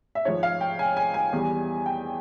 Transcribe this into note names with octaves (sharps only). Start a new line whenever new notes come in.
E5
G#2 F3 G#3 C#5
F5
G5
G#5
G#5
G#5
E2 E3 G3
G5